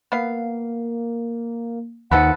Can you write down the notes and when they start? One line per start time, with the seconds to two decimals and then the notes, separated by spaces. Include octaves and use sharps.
0.12 A#3 B3 F5
2.11 D#2 D#3 F3 A4 B4 F#5